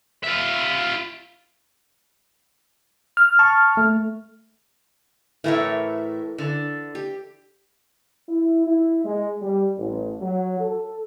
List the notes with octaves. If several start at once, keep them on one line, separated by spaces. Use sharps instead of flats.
F4 E5
F6
A5 C#6
A3
A2 E3 A3 A#4 C#5 E5
D3
G4
E4
E4
G#3
G3
A1
F#3
A4